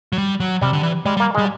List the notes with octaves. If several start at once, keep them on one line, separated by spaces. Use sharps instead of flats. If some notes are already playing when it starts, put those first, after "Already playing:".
F#3
G3
F#3
C3 G3
D3
E3
G3 G#3
G3
A#3
G3 G#3